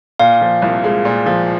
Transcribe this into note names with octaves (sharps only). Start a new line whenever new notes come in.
A#2 F5
F3
C2
G#3
A#2
F3